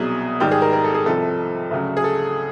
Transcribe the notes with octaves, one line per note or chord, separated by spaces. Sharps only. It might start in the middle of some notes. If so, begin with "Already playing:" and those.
Already playing: C2 B2 F#3 G#4
G#2 D#3 G3 G4
G#4
A#4
A#4
A4
G#4
C2 C3 F3 A4
D2 C#3 F#3
G#4
A4